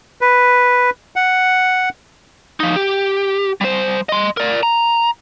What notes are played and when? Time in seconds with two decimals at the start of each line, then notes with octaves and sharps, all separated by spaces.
0.21 B4
1.16 F#5
2.60 F3 D#4
2.76 G4
3.61 G3 C5
4.09 D#5 C6
4.37 A#4 D5
4.63 A#5